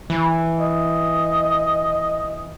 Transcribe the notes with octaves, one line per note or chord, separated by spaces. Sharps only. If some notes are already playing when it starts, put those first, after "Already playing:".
E3
D#5